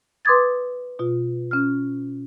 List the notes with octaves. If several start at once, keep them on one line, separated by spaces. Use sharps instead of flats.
B4 C6 D6 D#6 G#6 A6
B2 F4
C#4 F6